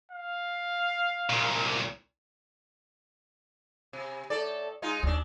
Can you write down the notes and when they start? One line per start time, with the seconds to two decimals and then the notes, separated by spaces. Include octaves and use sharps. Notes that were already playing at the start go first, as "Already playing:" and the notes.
0.12 F5
1.30 C2 A#2
3.93 C3
4.30 A2 A4 D5
4.82 G#3 D#4 F4
5.03 D#2 F#3 D4